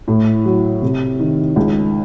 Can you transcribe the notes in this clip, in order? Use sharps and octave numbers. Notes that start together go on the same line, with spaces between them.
A2
F#3
C3
D#3
C#2